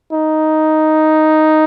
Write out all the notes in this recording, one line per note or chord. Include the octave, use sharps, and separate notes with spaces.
D#4